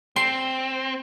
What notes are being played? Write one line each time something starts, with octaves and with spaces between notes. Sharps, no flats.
C4 C6